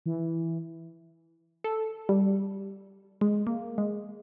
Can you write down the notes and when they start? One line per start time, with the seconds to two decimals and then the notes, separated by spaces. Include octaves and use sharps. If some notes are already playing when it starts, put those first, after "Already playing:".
0.06 E3
1.64 A4
2.09 G3
3.21 G#3
3.47 A#3
3.78 G#3